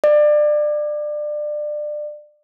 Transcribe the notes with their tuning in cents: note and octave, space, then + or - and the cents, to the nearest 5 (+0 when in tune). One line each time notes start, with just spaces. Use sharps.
D5 +25